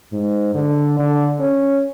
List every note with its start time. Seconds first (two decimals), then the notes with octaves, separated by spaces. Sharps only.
0.13 G#2
0.54 D3
0.99 D3
1.40 C#4